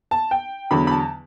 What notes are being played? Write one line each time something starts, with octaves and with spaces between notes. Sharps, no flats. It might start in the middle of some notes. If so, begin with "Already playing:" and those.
A5
G5
E2 D3 F#3 B5
B5
A5